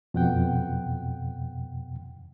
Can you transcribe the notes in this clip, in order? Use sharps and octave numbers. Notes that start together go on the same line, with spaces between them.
F2 B2 F#5 G5